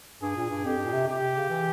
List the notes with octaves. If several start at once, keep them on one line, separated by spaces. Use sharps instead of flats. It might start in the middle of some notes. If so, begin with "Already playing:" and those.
G2 G#4
A#2
G2
F2 G4
G2
A#2
C3
C3 G4
C3
C#3
E3